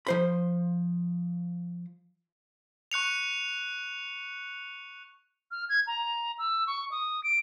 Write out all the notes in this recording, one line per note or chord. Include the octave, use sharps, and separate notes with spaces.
F3 C5 B5
C#6 F#6 C#7 F7
F6
G#6
A#5
E6
C#6
D#6
D7